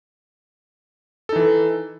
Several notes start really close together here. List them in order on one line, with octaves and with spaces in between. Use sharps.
A4 D#4 E3